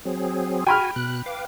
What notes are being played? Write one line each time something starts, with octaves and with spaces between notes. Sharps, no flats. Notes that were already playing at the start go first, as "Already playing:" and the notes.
F#3 C4 G#4
F#4 G5 G#5 B5 F6
B2 F#6
B4 F5 D6